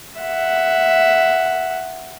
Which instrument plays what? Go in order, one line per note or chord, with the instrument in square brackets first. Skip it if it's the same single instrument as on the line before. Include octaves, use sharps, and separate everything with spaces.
[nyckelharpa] E5 F#5